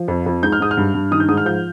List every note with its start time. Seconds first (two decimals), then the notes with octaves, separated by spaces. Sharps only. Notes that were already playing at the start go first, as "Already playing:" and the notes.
Already playing: F3
0.08 F2
0.26 F2
0.43 G#2 G6
0.52 F6
0.60 G#2 D#6
0.71 F6
0.77 G2
0.94 G2
1.11 D#3 D#6
1.20 G6
1.29 G#2 D#6
1.37 F6
1.46 F3 G6